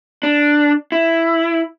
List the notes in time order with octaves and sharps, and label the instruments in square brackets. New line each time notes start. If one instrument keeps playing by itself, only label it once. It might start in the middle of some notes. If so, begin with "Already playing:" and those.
[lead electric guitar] D4
E4